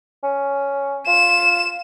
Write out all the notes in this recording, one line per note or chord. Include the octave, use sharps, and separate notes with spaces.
C#4
F4 E7